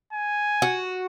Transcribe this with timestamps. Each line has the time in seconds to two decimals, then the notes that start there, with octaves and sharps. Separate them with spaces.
0.13 G#5
0.62 F#4